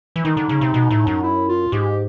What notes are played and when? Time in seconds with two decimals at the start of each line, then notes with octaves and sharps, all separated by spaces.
0.16 E3
0.24 D#3 D#4
0.37 D3
0.49 C#3
0.61 C3
0.74 B2
0.91 A2
1.07 F#2
1.23 E4
1.49 F4
1.72 G#2 G4